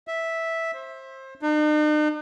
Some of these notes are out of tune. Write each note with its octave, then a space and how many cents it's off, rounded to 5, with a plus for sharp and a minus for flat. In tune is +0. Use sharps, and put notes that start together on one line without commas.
E5 -5
C5 +25
D#4 -45